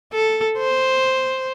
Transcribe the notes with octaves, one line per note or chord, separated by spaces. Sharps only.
A4
C5